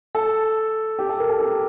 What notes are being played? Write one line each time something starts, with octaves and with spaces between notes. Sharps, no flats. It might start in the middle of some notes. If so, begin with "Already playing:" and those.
A4
G4
A4
A#4
A4
G4